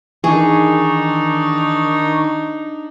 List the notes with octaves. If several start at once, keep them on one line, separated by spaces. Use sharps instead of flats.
D#3 E3 D4 D#4 G#4 C#6